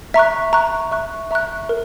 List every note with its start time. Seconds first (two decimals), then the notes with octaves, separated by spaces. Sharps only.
0.14 E5 A#5 C#6 F#6
0.53 E5 A#5 C#6 F#6
0.92 E5 A#5 C#6 F#6
1.31 E5 A#5 C#6 F#6
1.69 A#4